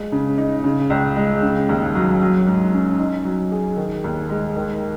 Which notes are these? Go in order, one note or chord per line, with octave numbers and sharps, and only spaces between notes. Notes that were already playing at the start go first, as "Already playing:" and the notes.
Already playing: G#3
C#3
D#4
C#3
C#2
G#3
C#3
D#2
F#3
F#3
G#2
C#4
D#4
F#3
G#4
D#3
D#2
G#3
D#3